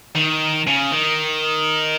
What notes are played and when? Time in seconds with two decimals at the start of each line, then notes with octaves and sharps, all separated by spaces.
0.16 D#3
0.67 C#3
0.92 D#3